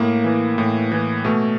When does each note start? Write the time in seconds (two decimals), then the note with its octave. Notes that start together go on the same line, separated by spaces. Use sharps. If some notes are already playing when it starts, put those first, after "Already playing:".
Already playing: A2 A#3
0.24 E3
0.58 A2
0.92 E3
1.24 B2 A3